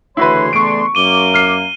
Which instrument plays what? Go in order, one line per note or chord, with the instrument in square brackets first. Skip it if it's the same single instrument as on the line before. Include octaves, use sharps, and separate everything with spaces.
[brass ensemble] D2 C#5 [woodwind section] C#3 E3 C6 [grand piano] E4 F#4 B4
[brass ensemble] A3 B3 D4 [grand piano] C#6 D7
[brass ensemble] F#2 A#3 [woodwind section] D6 [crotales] D#7 G7
[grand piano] F6 C7